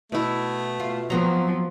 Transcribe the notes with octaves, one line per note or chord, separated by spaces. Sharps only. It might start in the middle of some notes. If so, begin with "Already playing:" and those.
B2 A3 E4
F4
F3 F#3 B3 C4 A#5